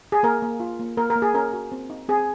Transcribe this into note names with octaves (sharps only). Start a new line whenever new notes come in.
G#4
A#3 A#4
A#3
F4
A#3
A#3 A#4
A#4
A#3
G#4
C#4 A#4
F#4
C4
D#4
C4 G#4